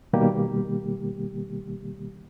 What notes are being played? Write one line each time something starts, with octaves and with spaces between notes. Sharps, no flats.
B2 D#3 G3 A#3 G4